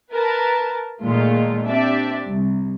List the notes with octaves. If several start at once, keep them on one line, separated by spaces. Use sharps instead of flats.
A#4 B4 A5
A#2 D#3 G#3 A3 F4
C4 D4 G4 D5 E5
C2